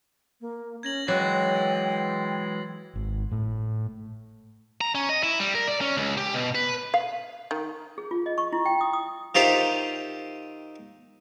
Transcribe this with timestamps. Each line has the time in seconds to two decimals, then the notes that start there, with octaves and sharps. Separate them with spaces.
0.41 A#3
0.83 C#4 G#6 A#6 F#7
1.08 E3 F#3 G#3 G5 A6 C7
2.95 G#1
3.32 A2
4.81 A#5
4.95 C#4
5.09 D#5
5.23 E4
5.40 G3
5.55 A#4
5.67 D5
5.81 C#4
5.97 C#2
6.17 G4
6.34 B2
6.55 B4
6.94 F5
7.51 D#3
7.98 G#4
8.11 F4
8.26 D#5
8.38 C#6
8.53 E4
8.66 G5
8.81 D#6
8.93 D#6
9.35 D#3 F4 G4 C5 E5